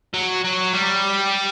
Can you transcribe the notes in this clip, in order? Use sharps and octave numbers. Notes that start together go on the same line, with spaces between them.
F#3
F#3
G3